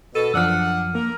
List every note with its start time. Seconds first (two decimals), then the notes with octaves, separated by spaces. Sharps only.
0.15 B2 A4 D#7
0.34 F#2 F3 D4 F#5 E6 F6
0.95 A#3 A#4